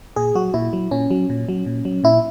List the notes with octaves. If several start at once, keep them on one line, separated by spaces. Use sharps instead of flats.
A#2 G#4
F#3 F#4
A#2 E4
F#3
A#2 C#4
F#3
A#2
F#3
A#2
F#3
A#2 E4